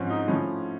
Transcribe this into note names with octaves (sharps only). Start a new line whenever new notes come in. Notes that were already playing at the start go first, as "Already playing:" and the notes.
Already playing: G#2 F3 C4 C#4
D#4
A2 F3 C#4